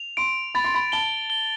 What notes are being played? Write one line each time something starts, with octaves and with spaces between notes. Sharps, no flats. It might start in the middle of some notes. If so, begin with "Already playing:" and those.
Already playing: F7
C6 D7
B5 A6
C6
B5
A5 G7
G7